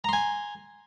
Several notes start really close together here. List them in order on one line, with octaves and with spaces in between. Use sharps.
A#5 C6 G#5